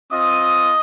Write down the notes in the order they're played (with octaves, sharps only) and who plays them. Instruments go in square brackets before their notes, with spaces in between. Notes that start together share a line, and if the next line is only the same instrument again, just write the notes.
[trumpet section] C4 F4 D#5 D#6